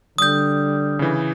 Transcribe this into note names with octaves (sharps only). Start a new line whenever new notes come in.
D3 G3 D#6 G6
C#3 E3